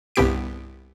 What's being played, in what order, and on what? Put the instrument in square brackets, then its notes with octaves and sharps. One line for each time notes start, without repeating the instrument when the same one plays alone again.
[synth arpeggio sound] C2 G2 B3 G4 B6 D7